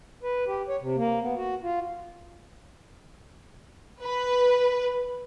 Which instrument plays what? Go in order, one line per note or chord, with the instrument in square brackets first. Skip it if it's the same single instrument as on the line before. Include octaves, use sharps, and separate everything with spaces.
[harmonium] B4
G4
C#5
C3
A#3
B3
F#4
F4
[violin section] B4